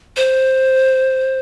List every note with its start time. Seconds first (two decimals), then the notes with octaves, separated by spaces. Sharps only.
0.17 C5